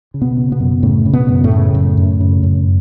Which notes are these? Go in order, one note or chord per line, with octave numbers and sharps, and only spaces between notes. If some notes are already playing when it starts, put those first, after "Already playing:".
C#3
B2 B3
C#3
B2 B3
F#2
A2 C#3 A3
C#3
B2 B3
F#2
A2 A3
C#3
F#2
F#2
C#3
F#2